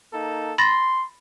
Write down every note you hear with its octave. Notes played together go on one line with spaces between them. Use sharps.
A#3 D#4 A4
B5 C6 A6 A#6